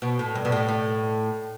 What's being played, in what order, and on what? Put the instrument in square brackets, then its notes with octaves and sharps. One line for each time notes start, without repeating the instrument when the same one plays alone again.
[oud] B2
A2
G2
B2
A2
A2